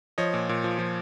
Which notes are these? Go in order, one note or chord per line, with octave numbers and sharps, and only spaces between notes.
F3 C#5 D#5
A#2
A#2
F3
F3